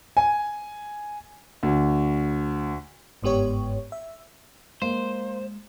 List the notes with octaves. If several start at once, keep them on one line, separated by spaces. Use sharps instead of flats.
G#5
D2
G1 G#2 B3 G4 C#5
E5
G#3 A#3 C5